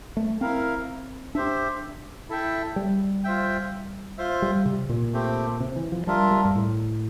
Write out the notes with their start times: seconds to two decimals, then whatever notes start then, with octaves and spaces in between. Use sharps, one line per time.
0.17 A3
0.41 C4 E4 A#4 F5
1.35 D4 G4 C5 E5
2.29 E4 A4 E5 G5
2.76 G3
3.24 F4 C5 E5 G5
4.18 F4 C5 E5
4.42 G3
4.66 C3
4.89 A#2
5.13 A3 C4 G4
5.60 C3
5.76 E3
5.92 F3
6.07 G3 D4 F4 A#4 E5
6.31 G3
6.45 G2
6.55 A2